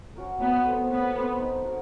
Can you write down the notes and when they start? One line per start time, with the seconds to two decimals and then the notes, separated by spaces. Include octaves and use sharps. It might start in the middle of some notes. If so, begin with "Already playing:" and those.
0.15 C#4 F#4 A#4
0.40 F#3 B3
0.65 A3 C4
0.90 F#3 B3
1.16 A3 C4
1.40 D#4
1.65 F#4 A#4 C#5